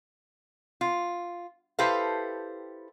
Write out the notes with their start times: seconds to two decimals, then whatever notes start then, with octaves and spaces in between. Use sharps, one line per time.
0.81 F4
1.79 E4 G4 A4 B4 C5 F5